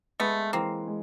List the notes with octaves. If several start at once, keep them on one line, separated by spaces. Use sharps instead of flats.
G#3 A3 B3
E3 A#3 C4
G#3